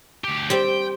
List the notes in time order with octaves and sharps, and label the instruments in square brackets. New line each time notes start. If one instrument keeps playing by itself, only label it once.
[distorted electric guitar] D2 G4
[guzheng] G3 C4 [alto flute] C5 [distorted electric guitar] G5